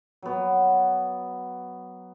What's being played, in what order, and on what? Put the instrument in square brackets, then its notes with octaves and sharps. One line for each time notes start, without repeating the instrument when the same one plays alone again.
[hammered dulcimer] F#3 B3